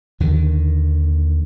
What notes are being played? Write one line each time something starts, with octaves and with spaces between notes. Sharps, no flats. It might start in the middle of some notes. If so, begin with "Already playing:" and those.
D#2 D3 D#3